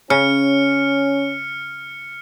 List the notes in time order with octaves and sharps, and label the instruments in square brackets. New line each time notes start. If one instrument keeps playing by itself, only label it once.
[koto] C#3 [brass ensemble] C#4 [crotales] F6 C#7